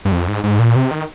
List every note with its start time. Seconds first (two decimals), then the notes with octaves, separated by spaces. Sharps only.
0.05 G2
0.12 F2
0.28 G#2
0.44 G#2
0.59 A#2
0.76 C3
0.91 D#3